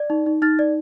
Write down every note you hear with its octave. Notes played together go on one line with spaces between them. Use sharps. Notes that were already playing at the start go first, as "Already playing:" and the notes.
Already playing: D5
D#4
D#4
D#4 F6 A6
D5